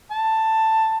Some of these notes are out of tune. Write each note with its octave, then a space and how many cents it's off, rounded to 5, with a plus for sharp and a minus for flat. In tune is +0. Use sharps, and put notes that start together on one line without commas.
A5 +10